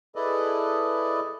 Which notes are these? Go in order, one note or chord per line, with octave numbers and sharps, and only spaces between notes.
E4 G#4 A4 B4 D5 D#5